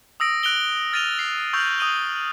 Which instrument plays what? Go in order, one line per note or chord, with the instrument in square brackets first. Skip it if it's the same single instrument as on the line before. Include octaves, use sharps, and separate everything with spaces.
[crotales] D#6 E6 A#6 D7
F#6 D7 F7 G7
F6 A6 A#6 D#7 F7 G7
C7
C#6 E6 F6 G6 F7 F#7
D#6 D#7 G7